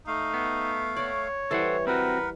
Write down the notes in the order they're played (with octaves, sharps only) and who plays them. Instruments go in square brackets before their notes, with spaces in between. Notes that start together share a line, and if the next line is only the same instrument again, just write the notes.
[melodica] A3 F5 [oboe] D#4
[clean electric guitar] B3
[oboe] C#5 [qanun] D5 F#5
[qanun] E3 G3 [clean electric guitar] A4 C5 F#5
[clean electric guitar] C4 F#4 [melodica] A#4 F#5 [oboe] B4